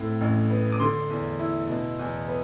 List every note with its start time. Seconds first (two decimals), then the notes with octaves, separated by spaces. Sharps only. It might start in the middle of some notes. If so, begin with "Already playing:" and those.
Already playing: A2 C4
0.21 A1
0.50 B3
0.72 D6
0.80 D3 C6
1.10 E2
1.39 E4
1.68 B2
1.99 E2
2.28 B3